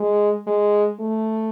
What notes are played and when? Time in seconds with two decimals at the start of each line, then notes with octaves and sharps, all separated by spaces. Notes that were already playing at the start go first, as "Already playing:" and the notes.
Already playing: G#3
0.47 G#3
1.00 A3